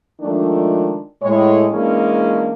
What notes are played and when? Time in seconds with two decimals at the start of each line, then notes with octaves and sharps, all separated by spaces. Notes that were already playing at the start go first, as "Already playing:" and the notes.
0.20 D#3 F3 G#3 A3 D4
1.22 A2 G#3 C#5
1.70 E3 G#3 A#3 C#4 D4